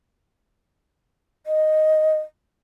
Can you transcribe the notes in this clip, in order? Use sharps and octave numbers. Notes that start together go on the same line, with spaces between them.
D#5